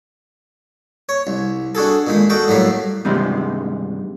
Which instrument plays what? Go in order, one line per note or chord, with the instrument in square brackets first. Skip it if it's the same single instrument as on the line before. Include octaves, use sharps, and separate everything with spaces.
[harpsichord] C#5
C2
D4 F#4 G#4 A4
A#2 D#3 G#3
F#4 A4 D#5 G5
A2 F#3 G3 A#3
[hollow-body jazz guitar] G2 C3 D#3 G3 G#3